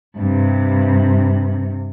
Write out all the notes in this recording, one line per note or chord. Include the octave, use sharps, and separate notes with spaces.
G2 C3